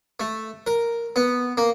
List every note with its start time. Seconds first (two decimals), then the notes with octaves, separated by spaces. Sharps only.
0.20 A3
0.67 A#4
1.16 B3
1.57 A#3